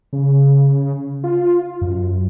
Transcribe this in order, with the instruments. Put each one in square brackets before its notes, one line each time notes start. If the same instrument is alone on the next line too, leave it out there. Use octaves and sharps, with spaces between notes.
[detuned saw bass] C#3
F4
F#2